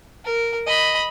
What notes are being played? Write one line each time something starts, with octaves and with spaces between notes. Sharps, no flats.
A#4
D#5 B5